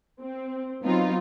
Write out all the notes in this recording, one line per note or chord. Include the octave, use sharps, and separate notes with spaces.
C4
F#3 B3 C4 D#4 F4